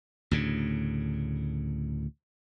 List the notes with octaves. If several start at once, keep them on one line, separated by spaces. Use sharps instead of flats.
D2 A2 C#3